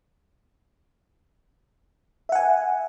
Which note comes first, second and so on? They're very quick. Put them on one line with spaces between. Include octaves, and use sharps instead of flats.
E5 F#5 G#5